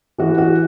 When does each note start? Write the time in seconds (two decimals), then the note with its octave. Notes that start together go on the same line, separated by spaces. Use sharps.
0.18 E3 F#4
0.38 F#4